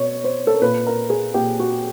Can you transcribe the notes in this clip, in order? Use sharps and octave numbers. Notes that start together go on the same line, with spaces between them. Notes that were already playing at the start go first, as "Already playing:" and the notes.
Already playing: B2 C#5
C5
A4
A#4
A#2 B4
A#4
G#4
A#2 G4
F#4